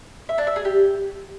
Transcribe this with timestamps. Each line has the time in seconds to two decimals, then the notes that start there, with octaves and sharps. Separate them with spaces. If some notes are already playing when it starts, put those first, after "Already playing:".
0.29 E5
0.38 D4
0.47 E5
0.56 G#4
0.65 G4